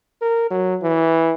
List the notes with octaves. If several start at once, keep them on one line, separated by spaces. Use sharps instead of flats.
A#4
F#3
E3